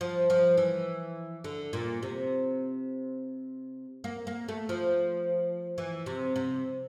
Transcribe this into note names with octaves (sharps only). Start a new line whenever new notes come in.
F3
F3
E3
D3
A#2
C3
A#3
A#3
A3
F3
E3
C3
C3